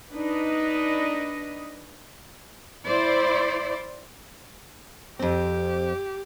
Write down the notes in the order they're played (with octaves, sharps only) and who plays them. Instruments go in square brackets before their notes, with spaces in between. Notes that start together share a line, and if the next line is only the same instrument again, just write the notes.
[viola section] D4 D#4 B4 D#5
[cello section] E4 C5 D5
[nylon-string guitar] F2 C4 [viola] G4